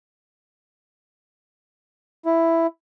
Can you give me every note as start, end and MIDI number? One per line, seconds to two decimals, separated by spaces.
2.26 2.67 64